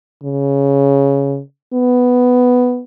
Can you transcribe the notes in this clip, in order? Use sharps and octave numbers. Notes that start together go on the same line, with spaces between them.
C#3
B3